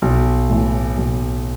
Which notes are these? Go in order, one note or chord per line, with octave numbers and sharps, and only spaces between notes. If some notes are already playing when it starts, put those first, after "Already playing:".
B1
A2 E3
B1